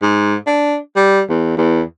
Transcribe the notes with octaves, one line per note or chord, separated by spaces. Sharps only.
G#2
D4
G3
E2
E2